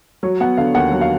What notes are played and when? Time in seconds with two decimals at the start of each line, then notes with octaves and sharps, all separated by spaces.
0.23 F#3 C#5
0.40 B3 F#5
0.57 D3 F5
0.75 D#2 F#5
0.92 F#3
1.01 F5